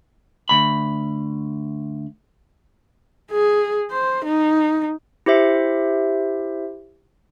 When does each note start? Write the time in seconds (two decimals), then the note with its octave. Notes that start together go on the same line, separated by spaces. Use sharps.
0.49 D2 B5
3.31 G#4
3.91 C5
4.25 D#4
5.26 E4 G4 C5 E5